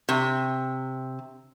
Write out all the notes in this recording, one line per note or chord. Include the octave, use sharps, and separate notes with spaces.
C3